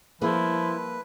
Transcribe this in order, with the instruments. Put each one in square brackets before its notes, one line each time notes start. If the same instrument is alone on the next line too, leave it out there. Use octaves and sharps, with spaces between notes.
[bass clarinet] F3 [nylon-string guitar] G3 A#3 G#4 [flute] E4 [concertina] B4